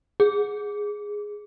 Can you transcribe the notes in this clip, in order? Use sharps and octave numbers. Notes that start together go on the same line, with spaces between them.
G#4